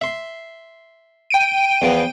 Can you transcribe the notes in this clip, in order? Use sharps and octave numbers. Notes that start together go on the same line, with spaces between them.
E5 C6
G5 D7 D#7
E2 F3 B3